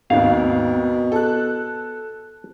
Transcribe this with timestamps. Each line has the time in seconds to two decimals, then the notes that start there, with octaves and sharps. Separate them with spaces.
0.10 G#1 D#2 B2 F5
1.12 A4 F#6